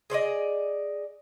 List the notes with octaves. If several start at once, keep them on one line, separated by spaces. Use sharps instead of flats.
G#4 C5 D5 D#5